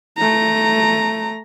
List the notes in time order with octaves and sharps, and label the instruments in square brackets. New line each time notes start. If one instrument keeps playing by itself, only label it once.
[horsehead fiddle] A3 A#5